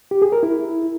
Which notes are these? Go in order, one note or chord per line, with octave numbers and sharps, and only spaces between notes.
G4
G#4
A#4
E4